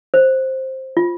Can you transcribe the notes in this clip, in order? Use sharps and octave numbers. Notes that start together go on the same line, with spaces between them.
C5
F4